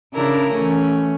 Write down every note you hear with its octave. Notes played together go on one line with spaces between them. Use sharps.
C#3 D4 E4 A#4
E3 A3 C#4